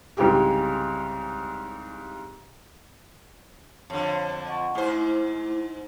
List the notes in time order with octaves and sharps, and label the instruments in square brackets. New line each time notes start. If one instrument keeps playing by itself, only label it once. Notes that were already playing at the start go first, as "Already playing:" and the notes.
[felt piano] C2 G#2 C#3 G#3 G4
[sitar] F2 D3 [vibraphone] C#5
[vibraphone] D#5 F#5 C#6
[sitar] G#2 C5 [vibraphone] A3 E4 D6